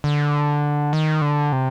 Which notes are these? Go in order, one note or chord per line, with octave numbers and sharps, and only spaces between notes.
D3
D#3
D3
C3